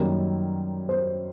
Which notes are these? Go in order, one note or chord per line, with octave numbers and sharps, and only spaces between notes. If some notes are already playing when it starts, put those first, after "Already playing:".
Already playing: F#2 D#3 G3 A#3
C5